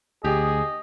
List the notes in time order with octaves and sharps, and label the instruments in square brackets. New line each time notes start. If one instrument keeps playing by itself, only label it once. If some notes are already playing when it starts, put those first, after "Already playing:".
[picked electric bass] D2 [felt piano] G4 [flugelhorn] G#4 [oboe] D#5